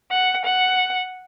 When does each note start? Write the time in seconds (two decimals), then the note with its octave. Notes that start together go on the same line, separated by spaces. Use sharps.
0.11 F#5
0.45 F#5